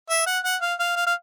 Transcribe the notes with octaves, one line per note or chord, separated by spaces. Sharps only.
E5
F#5
F#5
F5
F5
F5
F5